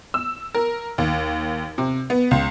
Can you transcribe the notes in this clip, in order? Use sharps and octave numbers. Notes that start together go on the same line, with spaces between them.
E6
A#4
D#2
C3
B3
C#2